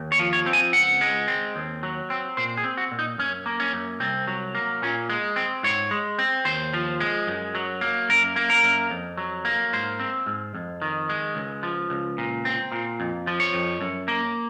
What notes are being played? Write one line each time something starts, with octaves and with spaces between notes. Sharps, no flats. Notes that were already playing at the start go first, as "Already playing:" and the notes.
Already playing: D#2
C#5
F3
C#5
C4
G#5
C#2 F#5
G#3
C4
D#2
F#3
C4
A#2 C5
G#4
C4
F#4
A#2
D#4
F#2 C#4
A#3
C#4
F#2
C2 C4
F#3
A#3
A#2 C#4
G#3
C4
G#2 C#5
G#3
C4
D#2 C5
F3
G#3
F#2
F#3
A#3
F#2 A#4
A#3
A#4
F#2
F2
F#3
A#3
G#2 C5
C4
G#2
F2
D#3
G#3
C#2
F3
C#2
A#2
C4
A#2
F2
F3
C#5
F2
F#2
A#3